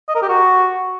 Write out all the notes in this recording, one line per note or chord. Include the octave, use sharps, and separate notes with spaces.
D#5
A#4
G4
F#4